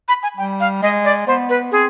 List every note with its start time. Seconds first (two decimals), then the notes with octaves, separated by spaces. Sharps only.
0.08 B5
0.23 G#5
0.37 G3 G5
0.60 F5
0.82 G#3 D#5
1.05 D5
1.27 B3 C5
1.49 B4
1.72 C4 G#4